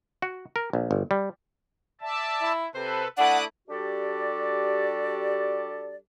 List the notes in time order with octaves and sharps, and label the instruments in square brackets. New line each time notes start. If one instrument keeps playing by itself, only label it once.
[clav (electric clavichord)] F#4
A#4
A#1
G1
G3
[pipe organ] D5 E5 A5
[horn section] E4
[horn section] C3 C5 [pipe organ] A4 B4
[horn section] A3 D4 E4 [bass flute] F#5 [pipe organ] D6 D#6 F#6
[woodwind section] G3 D4 F#4 G4 A4 D5